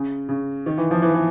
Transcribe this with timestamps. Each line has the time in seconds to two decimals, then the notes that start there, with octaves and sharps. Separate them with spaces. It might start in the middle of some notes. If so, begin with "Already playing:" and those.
Already playing: C#3
0.29 C#3
0.66 D#3
0.78 E3
0.91 F3
1.02 E3
1.14 E3